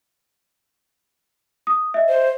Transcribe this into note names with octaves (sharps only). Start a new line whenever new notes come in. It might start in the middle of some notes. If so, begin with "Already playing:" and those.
D#6
D#5 E5
C5